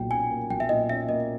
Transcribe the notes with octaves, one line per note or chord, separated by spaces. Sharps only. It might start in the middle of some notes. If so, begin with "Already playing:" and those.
Already playing: B1 A#2 G5
C#4 G#5
A#3
B1 G5
E5
A#2 D#5
C#4 E5
A#3 D#5